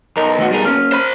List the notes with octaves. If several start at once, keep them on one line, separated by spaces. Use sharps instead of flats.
B1 A#4 D#5
D#2 A3 F#4
G3 G#4 A#4
A#3 C#4 F6
C5 B5